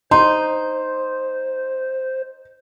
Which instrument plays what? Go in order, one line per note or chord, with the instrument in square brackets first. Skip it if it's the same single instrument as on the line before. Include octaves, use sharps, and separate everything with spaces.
[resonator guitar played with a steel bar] D#4 [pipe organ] C5 [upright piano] C6